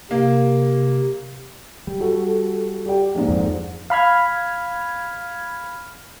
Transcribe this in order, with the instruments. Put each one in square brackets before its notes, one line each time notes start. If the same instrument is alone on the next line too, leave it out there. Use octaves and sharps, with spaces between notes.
[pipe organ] C3 [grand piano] A#3
[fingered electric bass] G3
[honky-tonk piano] F#4 A4
G4 D5 G5
A#1 G#2
[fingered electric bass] F2
[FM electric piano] F5 B5 F6 G#6